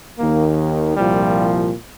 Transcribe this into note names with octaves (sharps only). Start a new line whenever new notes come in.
D#2 D#3 A#3
C2 A#2 F3 G3